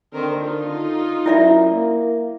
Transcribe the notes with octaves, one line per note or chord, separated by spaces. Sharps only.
D3 D#3 C4 A#4
D#4 F4
F#2 E4 D5 E5
A#3